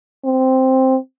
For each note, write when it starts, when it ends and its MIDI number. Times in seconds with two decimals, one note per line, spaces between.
0.25 0.97 60